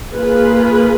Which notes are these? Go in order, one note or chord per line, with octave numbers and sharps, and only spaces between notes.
A#3 F4 G#4 B4